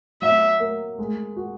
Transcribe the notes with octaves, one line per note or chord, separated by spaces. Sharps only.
F#3 E5
A#3
G#3
F#4